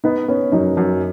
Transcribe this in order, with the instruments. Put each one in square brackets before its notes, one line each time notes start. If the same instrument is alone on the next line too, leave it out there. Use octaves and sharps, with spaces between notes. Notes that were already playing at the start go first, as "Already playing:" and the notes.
[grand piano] B3 [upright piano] D#4
[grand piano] B3 [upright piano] C#4
[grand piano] F#2 [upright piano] D#4
[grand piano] F#2